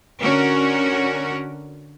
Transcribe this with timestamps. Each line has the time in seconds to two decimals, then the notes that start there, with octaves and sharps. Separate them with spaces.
0.21 D3 C#4 F#4 A#4